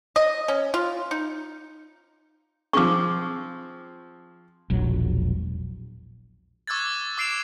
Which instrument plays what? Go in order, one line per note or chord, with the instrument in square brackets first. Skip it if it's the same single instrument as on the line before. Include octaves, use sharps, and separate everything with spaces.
[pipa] D#5
C#4
F4
D#4
[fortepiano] F3 C4 G#4 [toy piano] C#6 D6
[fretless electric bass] E1 A#1 F#3
[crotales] C#6 D6 E6 F#6 G#6 A6
D6 E6 C7 D7 E7 F7